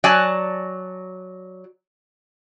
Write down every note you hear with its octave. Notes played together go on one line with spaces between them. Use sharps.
F#3 D5 G#5 A5